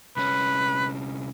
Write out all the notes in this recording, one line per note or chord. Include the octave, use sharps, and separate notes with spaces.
C2 C#4 B4